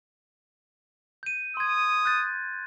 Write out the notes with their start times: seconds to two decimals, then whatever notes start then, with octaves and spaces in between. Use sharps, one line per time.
1.23 G6 D#7
1.57 C6 D#6 G#6
2.05 F#6 G6 A6